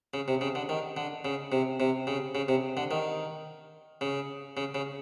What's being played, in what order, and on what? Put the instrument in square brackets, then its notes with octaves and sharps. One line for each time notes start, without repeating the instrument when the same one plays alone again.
[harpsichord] C#3
C3
C#3
D3
D#3
D3
C#3
C3
C3
C#3
C#3
C3
D3
D#3
C#3
C#3
C#3